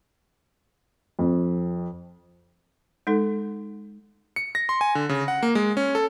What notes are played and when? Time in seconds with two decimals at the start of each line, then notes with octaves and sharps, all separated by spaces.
1.19 F2
3.07 G#3 D#4 A4
4.36 C#7
4.55 A#6
4.69 C6
4.81 G#5
4.95 D3
5.09 C#3
5.28 F#5
5.43 A#3
5.55 G#3
5.77 C#4
5.95 A4